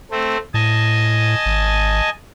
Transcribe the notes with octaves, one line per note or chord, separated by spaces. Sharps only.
A3 C4
A2 D#5 G#5 A5
G#1